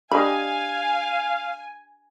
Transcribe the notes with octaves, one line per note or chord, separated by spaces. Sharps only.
D4 G4 D#5 F5 G#5 B5